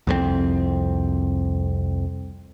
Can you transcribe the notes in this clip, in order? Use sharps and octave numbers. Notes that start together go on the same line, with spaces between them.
C2 F2 G#3 C4